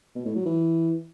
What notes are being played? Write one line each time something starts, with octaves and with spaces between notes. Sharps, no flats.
B2
A2
F#3
E3